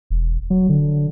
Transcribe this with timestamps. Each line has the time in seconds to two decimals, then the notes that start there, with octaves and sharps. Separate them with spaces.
0.10 E1
0.50 F#3
0.69 D3